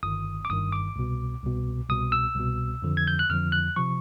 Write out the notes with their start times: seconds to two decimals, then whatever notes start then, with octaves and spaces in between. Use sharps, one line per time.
0.03 G1 G2 D#3 D#6
0.45 D6
0.50 G1 G2 D#3 D#6
0.72 D6
0.96 C2 B2
1.43 C2 B2
1.89 C2 B2 D#6
2.12 E6
2.36 C2 B2
2.82 F2 D3 F3
2.97 G#6
3.07 G6
3.19 F#6
3.30 F2 D3 F3 F6
3.52 F#6
3.76 C3 F3 C#6